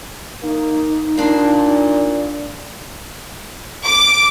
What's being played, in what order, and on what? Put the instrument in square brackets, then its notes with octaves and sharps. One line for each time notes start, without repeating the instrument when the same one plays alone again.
[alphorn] A#3 [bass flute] D#4
[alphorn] A#2 [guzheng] A#3 D4 C5
[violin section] D6